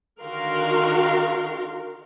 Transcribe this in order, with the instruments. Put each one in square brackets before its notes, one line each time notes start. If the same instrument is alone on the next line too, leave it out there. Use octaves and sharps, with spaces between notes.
[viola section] D3 D#3 F#4 A#4 F5 C6